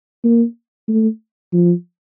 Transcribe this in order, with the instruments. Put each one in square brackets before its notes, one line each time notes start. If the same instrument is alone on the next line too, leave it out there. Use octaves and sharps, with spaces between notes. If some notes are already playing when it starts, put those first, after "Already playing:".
[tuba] A#3
A3
F3